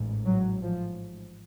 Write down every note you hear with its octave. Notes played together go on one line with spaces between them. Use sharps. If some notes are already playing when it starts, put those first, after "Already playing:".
Already playing: A1 G#2
F#3
F3